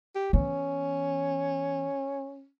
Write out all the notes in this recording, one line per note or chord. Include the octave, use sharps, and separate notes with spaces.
G4
E3 B3 C#4